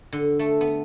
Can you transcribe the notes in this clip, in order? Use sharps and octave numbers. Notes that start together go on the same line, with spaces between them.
D3
A3
B3